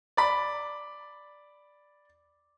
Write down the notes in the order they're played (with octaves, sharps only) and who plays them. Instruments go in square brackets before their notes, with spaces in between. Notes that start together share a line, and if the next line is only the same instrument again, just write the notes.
[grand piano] D5 B5